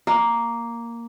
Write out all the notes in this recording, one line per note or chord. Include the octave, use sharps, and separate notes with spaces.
A#3